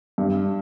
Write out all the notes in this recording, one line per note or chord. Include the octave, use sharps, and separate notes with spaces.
G2